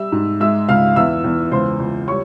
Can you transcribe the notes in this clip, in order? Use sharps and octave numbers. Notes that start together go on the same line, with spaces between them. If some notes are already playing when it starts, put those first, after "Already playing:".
Already playing: G3 E5 E6
G#2
G#3 E5 E6
C#2 F5 F6
E2 E5 E6
E2
C#2 C5 C6
C#2
G3 C#5 C#6